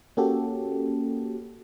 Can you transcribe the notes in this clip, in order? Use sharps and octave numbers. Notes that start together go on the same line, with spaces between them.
A#3 C#4 F#4 G4 A4